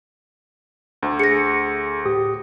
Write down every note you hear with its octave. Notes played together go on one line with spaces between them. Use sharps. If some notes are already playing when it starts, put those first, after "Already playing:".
D2
G#4 A#6 C#7
A2 G4 D#6